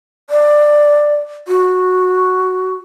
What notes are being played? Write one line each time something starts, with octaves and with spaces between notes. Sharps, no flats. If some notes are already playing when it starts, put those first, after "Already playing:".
D5
F#4